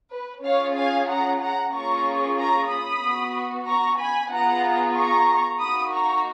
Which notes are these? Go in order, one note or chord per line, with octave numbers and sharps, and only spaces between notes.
B4
C#4 F4 G#4 C#5 F5
F5 G#5
F#5 A#5
F#5 A#5
A#3 C#4 F4 G#4 A#5 C#6
A#5 C#6
B5 D#6
B3 F#4
A#5 C#6
G#5 B5
B3 F4 G#4 F#5 A#5
A#5 C#6
A#3 D#4 F#4 B5 D#6
A#5 C#6